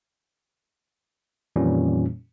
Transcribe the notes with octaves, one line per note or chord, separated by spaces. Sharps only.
F2 A#2 D#3 E3 G3 C#4